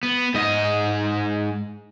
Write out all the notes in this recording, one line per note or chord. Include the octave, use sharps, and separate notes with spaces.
B3
G#2 D#5